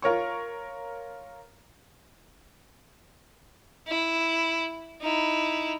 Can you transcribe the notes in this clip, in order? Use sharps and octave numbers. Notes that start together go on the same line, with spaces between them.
F4 A#4 C#5 C#6
E4
D#4 E4